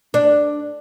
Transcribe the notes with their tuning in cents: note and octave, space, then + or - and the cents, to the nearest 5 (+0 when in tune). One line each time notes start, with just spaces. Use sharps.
D4 +5